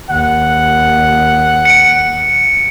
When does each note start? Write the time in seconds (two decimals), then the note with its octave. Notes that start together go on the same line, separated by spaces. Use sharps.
0.10 D#2 F#5
1.65 C#7 D7